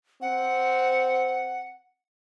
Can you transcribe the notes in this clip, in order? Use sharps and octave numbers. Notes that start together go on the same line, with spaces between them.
C4 F#5